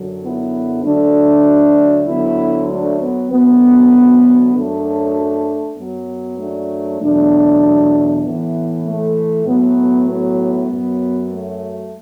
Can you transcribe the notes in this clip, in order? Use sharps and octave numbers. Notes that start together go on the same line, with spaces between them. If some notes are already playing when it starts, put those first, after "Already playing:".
Already playing: F#2 D3 F#3
B3 E4
D2 D3 F#3 A3 D4
D2 D3 F#3 B3 E4
A3 D4
B3
D2 D3 F#3 B3
F#2 F#3 A3 D4
F#2 F#3 B3
A3 D4
E2 B2 F#3 A3 D4
A2 E3 B3
A3
A2 F#3 B3
B3
F#2 F#3
A3